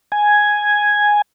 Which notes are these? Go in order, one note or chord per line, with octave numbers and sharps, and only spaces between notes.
G#5